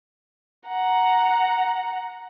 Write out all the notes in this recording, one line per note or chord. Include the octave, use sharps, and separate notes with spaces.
F#5 A#5